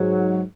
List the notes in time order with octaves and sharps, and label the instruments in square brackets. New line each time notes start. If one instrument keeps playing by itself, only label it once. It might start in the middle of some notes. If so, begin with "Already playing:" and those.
Already playing: [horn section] G#2 F#3